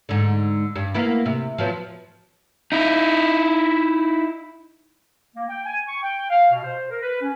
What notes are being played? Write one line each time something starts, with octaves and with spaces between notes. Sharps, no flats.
G#2 D3
G2
A#3 B3 E4
C3
F3 F#3 B3
D#4 E4
A#3
G5
G#5
C#6
G5
F5
B2
C5
A#4
B4
C#4